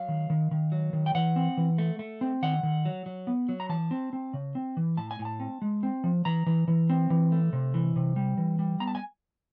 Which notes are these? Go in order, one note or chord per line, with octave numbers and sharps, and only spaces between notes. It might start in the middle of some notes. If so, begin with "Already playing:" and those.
Already playing: F#3 F5
D#3
D#3
D#3
F#3
D#3
G5
E3 F#5
C4
E3
A3
A3
C4
D#3 F#5
D#3
F#3
F#3
B3
F#3
A#5
E3 A5
C4
C4
C#3
C4
E3
A2 A5
G#5
A2
A5
C4
G#3
C4
F3
E3 A#5
E3
E3
C4
E3
A3
C3
E3
C3
G3
E3
G3
B3 A#5
A5
G#5